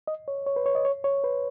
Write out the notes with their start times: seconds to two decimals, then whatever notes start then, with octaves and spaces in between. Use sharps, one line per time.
0.07 D#5
0.28 C#5
0.46 C#5
0.56 B4
0.66 C#5
0.75 D#5
0.85 C#5
1.04 C#5
1.24 B4